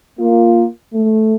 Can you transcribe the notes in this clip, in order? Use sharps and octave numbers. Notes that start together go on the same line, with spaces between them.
A#3 F4
A3